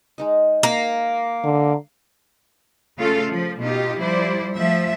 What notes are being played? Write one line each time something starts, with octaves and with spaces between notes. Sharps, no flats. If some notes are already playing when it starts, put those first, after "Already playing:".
G#3 D#4 D#5
A#3
D3
C#3 A3 F4 A4 F5
F3
B2 D#4 F4 G4
F3 G3 E4 C5 D5
F3 A3 E5